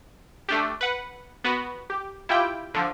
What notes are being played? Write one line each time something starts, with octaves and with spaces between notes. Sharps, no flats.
A3 D4 G4
B4 F#5
B3 F#4 B4
G4
E4 F4 G4 G5
D3 F3